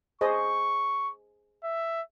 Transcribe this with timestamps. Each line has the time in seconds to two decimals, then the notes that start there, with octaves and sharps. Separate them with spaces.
0.21 G#4 C5 D#5 C#6
1.64 E5